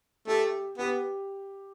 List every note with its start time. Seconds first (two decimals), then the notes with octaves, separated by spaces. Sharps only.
0.27 A3 G4
0.78 B3 G4